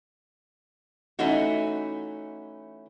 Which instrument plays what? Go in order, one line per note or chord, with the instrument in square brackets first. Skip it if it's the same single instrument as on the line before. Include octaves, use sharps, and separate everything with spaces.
[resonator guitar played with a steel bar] E3 A3 C#4 D#4 F#4